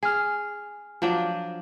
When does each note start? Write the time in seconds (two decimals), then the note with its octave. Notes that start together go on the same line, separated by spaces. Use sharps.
0.03 G#4 G#5 F6
1.02 F3 F#3 D4